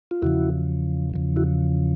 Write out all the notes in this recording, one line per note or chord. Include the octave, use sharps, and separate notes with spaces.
F4
E2 C#3 F3 E4 F#4
E2 C#3 F3
E4 F#4